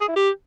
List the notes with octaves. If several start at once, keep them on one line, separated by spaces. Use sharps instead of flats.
G#4
E4
G4